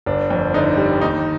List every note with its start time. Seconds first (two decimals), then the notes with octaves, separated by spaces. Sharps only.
0.06 G1 D4
0.30 F2
0.54 D3 D#4
0.77 G3
1.01 D#2 D#4